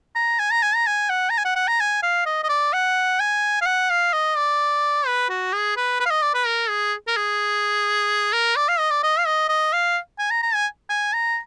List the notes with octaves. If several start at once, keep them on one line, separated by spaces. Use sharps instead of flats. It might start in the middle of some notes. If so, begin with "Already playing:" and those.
A#5
G#5
A#5
G#5
A#5
G#5
F#5
A#5
G#5
F#5
F#5
A#5
G#5
F5
D#5
D#5
D5
F#5
G#5
F5
F#5
F5
D#5
D5
B4
F#4
G#4
B4
B4
F5
D#5
D5
B4
A#4
G#4
A#4
G#4
A#4
D5
F5
D#5
D5
D#5
F5
D#5
D#5
F5
G#5
A#5
A#5
G#5
G#5
A#5